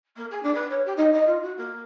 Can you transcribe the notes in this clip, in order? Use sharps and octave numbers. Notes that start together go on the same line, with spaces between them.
A#3
G#4
D4
B4
C#5
G4
D#4
D#5
F4
F#4
A#3